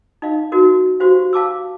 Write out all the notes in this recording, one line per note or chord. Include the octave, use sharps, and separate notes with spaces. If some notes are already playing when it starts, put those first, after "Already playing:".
D#4 D#5 F5
D#4 F#4 A#4
F#4 G4 C5 F5
F5 A5 D6 E6